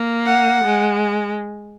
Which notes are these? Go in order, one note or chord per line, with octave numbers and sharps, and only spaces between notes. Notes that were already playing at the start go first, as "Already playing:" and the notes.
Already playing: A#3
F#5
G#3